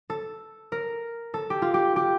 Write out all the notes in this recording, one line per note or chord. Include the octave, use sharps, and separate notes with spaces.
A4
A#4
A4
G4
F4
G4
G4